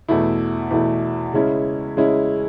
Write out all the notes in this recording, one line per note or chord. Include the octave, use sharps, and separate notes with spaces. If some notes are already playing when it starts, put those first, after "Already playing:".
E2 B2 A3 E4
E2 B2 A3 E4
C#3 G#3 C#4 E4
C#3 G#3 C#4 E4